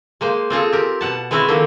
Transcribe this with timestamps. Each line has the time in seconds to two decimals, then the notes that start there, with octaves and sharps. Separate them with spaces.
0.21 G#3 A#3 C5
0.50 C4 F4 G#4 A4
0.72 G4 A#4
1.01 B2 F#5 A5
1.31 G#3 B3 C4 E4 F#4 E5
1.48 D3 D#3 F3 A#3